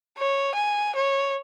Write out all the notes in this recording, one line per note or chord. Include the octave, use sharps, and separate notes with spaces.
C#5
G#5
C#5